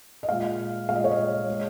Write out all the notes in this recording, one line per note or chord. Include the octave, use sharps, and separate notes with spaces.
D#5
A#2 G#3 F5
A#2 G#3 F5
D#5
C#5
D#5
G#3